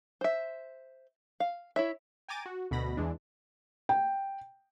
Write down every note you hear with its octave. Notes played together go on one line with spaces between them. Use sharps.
C5 E5
F5
E4 C#5 E5
G5 G#5 A#5 D6 A6 D#7
F#4
D2 B2 B5 A#6
E2 E3 G#3 D4
G5